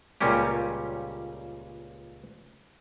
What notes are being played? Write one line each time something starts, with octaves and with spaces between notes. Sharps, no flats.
C#2 A#2 G3 A#3 C#4 G4